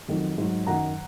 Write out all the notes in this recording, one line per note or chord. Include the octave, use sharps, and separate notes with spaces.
F2 D#3 F#3
G#2 F#3
F#2 D#3 F#3 F#5 A#5